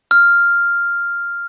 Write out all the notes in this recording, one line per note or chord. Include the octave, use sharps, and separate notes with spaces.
F6